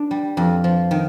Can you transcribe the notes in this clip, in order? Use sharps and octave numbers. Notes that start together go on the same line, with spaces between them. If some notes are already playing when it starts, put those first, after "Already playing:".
Already playing: D4
G3
F2
F3
D#3